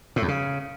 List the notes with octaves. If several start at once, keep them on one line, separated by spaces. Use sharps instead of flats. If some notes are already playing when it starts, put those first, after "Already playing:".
A2
E2
C#3